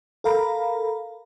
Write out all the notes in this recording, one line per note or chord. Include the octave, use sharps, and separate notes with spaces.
A4 A#4 F5 A#5 B5